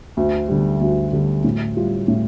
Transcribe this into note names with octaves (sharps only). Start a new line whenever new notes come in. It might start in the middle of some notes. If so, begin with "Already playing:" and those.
D2
D3 G3
D2
D3 G3
A2
G3 F4
A2